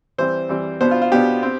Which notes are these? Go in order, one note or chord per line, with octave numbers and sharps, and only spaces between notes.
E3 G3 C4 C5
E3 G3 C4
B2 B3 D4 C5
F4
F4
B2 B3 D4 G4
C4